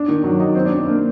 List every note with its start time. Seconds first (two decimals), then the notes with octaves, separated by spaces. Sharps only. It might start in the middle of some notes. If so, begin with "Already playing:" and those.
Already playing: D4
0.08 D#3
0.24 F#3
0.40 D#4
0.55 C4
0.65 D4
0.76 D4
0.87 A#3